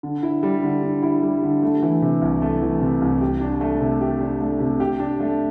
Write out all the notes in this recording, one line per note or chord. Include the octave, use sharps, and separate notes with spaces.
D3
E4
G3
D3
D3
E4
G3
D3
A3
E3
C3
C2
A3
E3
C3
C2
G4
D4
A3
C3
G4
D4
A3
C3
G4
D4
A3